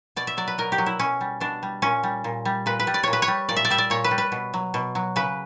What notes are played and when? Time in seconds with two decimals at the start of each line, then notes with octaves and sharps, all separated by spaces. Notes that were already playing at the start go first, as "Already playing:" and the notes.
0.16 B2 D5
0.27 E5
0.37 F#3 D5
0.47 B4
0.58 B2 A#4
0.72 G4
0.78 F#3
0.86 E4
0.99 B2 C#4
1.21 G3
1.40 B2 D4
1.63 G3
1.82 A#2 C#4
2.03 G3
2.24 A#2
2.45 G3
2.66 A#2 B4
2.80 B4
2.87 G3
2.94 D5
3.03 A#2 C#5
3.13 B4
3.22 C#5
3.28 G3
3.49 A#2 D5
3.56 E5
3.65 D5
3.70 G3 E5
3.78 D5
3.90 A#2 C#5
4.04 B4
4.11 G3
4.18 B4
4.32 B2
4.54 F#3
4.74 B2
4.95 F#3
5.16 C#3 B4